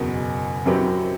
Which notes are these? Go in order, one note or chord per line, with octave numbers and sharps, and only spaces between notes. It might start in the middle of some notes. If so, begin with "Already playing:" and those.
Already playing: F#1 E2 B2
F#2 F#3 C4 G4 B4